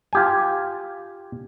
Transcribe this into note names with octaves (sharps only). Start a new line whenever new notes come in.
F4 G4 G#5